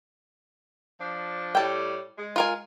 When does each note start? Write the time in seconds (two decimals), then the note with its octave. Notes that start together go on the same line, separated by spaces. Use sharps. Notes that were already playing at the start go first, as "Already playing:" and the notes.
0.99 F3 D4
1.55 A2 G3 G5 A5
2.18 G#3
2.36 F4 A#4 G#5